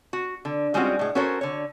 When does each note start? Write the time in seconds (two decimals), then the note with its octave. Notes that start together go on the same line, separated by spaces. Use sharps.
0.13 F#4
0.45 D3
0.74 G3 G#3 C4 C#4 F4 F#4
0.99 A2 G#3
1.15 C#4 F#4 A4 A#4 C5 C#5
1.41 D3 C#5